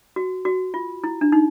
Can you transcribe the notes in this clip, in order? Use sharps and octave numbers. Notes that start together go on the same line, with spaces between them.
F#4
F#4
F4
E4
D4
D#4